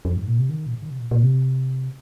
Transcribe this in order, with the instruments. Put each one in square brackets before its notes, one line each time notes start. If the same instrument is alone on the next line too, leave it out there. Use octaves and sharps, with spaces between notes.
[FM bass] F2
G#2
A#2
C3
D#3
A#2
G#2
D#3
C3
A#2
A#2
C3